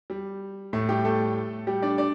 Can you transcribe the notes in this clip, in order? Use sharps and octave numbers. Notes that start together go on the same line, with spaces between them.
G3
A2 A3
G3 G4
A3 A4
G3 G4
D4 D5
D4 D5